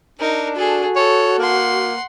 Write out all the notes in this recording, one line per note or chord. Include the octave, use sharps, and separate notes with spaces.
D4 D#4 A#4
F#4 G#4 A4
A4 C#5
A#3 F#5 C6